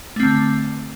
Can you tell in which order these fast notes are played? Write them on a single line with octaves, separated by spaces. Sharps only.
A3 C4 D3